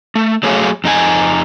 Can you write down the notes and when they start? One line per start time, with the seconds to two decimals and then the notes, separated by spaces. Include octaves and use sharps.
0.15 A3
0.43 F#3 A3 G#4 C#5 F5
0.84 F2 D#4 F4 G#5